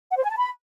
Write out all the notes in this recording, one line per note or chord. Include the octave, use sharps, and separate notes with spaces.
F#5
C5
G#5
A5
B5